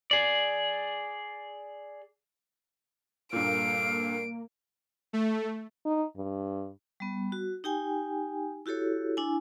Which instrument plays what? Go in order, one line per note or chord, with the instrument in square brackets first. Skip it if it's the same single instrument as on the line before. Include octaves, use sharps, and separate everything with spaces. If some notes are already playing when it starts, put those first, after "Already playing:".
[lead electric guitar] G#4 D5
[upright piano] G2 A#2 [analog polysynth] A#3 [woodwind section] A4 F5 [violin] D7
[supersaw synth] A3
[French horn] D#4
G2
[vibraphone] G3 B3
F#4
D#4 G4 G5 G#5
E4 F#4 G4 A4 C#5
D4 E4 G#5